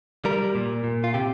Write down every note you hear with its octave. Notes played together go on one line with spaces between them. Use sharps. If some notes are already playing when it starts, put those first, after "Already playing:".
G3 A#4
A#2
A#2
F4
C3 G4